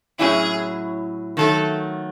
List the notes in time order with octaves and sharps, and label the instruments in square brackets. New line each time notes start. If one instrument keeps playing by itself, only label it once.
[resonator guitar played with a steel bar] A2 F#3 C#4 E4 [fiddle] G#4
[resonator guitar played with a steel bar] D#3 F#3 A3 [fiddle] A4